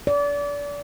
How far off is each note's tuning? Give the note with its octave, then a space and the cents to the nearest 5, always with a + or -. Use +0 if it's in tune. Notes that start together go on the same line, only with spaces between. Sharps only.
D5 -30